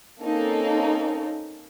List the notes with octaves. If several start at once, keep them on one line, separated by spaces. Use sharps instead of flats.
A#3 C4 C#4 D#4 A4